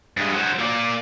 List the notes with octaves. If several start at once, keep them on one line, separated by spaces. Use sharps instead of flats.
G2 G#3
F#3 C5
A#3 D5